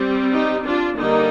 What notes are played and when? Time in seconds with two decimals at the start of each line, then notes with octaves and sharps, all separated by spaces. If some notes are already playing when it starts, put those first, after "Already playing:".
Already playing: G3 C4
0.32 D#4 G4
0.64 D4 F4
0.97 D3 G3 A#3 D#4